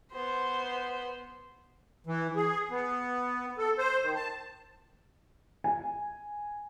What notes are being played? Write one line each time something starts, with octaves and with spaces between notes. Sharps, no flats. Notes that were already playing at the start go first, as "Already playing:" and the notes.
B3 C5
E3
G#4
B3
A4
C5
D#3
A5
G#5